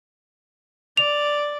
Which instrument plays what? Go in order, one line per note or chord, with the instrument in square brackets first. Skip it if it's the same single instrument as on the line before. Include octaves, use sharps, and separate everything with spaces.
[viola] D5 [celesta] F7